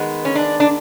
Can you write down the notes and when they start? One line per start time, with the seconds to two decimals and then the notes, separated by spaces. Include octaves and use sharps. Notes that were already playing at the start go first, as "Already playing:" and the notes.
Already playing: D#3 G#3 B3
0.25 C#4
0.35 D4
0.60 D4